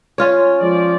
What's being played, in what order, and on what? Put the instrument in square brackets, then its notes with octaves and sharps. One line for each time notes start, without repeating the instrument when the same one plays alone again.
[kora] C#4 F4 C#5
[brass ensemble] F3 G#3 D5